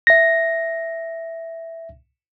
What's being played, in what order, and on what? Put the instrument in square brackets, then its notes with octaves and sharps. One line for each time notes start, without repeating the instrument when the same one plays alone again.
[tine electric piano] E5 A#6